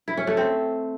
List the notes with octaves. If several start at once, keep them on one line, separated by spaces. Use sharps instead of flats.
E4
C#4
A3
C4